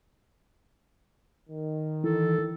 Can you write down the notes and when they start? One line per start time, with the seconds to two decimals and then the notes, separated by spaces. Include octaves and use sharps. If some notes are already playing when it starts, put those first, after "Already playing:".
1.50 D#3
2.04 E3 A4